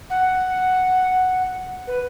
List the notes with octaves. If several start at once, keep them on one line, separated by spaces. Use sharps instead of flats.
F#5
B4